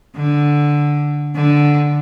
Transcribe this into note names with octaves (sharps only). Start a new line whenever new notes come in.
D3
D3